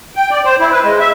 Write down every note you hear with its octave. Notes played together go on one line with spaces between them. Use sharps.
G5
D5
C5
E4
B4
G#3
E5